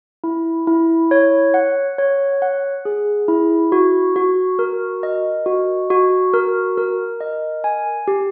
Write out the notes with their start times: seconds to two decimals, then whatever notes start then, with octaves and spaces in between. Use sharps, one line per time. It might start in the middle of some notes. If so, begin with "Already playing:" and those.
0.24 E4
0.67 E4
1.11 C#5
1.54 F#5
1.98 C#5
2.42 F#5
2.85 G#4
3.28 E4
3.72 F#4
4.16 F#4
4.59 A#4
5.03 D#5
5.46 F#4
5.90 F#4
6.33 A#4
6.78 A#4
7.20 D#5
7.64 G#5
8.08 G4